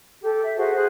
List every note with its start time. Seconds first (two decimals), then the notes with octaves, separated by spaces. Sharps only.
0.22 G4 A4
0.43 E5
0.57 F#4 G#4 C5 A5
0.75 G#4 C5 F#6